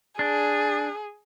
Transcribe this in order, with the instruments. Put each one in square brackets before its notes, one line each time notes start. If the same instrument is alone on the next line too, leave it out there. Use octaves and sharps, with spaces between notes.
[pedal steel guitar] D4 [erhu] G#4